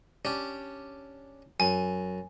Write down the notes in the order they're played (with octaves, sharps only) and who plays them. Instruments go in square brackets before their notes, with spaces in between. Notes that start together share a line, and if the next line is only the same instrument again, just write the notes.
[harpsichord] C#4 D4 G4
[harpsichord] F#2 [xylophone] G#5